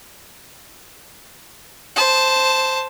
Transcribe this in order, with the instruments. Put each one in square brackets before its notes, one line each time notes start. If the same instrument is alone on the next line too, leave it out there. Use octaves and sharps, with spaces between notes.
[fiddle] C5 A5